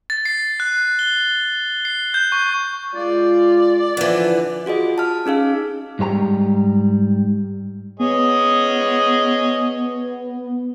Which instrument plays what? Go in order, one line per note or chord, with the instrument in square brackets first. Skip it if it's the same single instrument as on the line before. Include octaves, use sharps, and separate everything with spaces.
[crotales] A6
C7
F#6
G7
C7
G6
C#6
[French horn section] G#3 F4 [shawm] D5
[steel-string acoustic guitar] D3 E3 [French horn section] F3
[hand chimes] F4 F#4 G#4 D#5
A5 F6
C#4 D#4 G#4 F5
[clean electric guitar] G#2 G3 C5 A#5
[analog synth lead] B3 [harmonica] G#4 C#5 D#5